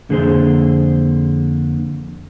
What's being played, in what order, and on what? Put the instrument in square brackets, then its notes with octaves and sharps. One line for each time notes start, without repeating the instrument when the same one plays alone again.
[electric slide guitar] F2 D3 A#3 G#4 A4 C5